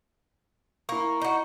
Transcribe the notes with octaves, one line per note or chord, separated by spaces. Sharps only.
A#3 E4 C#6
D#4 F#4